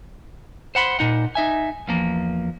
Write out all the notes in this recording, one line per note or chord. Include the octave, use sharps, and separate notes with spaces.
C5 F#5 B5 C6
A#2 D#4 F#5
D#4 E5 G#5
E2 F3 A#3